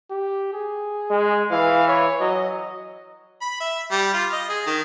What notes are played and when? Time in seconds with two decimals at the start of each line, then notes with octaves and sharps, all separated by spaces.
0.10 G4
0.53 G#4
1.10 G#3
1.51 E3 F5
1.88 C#5
2.20 F#3 D#5
3.41 B5
3.60 E5
3.91 G3
4.14 F4
4.32 D#5
4.49 G#4
4.67 D#3